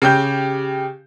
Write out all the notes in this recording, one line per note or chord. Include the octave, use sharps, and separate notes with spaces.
C#3 G4 G6